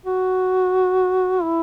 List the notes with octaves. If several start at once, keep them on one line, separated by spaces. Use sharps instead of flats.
F#4
E4